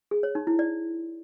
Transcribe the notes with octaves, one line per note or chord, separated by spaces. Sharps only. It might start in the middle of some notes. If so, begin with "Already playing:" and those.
G#4
C#5
D#4
E4
D5